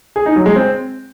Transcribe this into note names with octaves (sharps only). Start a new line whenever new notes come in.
G#4
D#4
F#3
G#3
C4